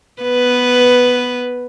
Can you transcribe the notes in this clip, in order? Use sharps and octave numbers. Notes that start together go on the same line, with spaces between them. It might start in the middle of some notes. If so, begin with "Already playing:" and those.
B3 B4